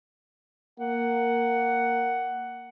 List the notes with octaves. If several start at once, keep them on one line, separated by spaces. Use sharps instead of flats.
A#3 F#5